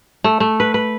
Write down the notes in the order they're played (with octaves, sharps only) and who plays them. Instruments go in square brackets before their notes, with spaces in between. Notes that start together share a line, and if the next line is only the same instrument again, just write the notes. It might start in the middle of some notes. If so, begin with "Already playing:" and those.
[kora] A3
A3
B4
B4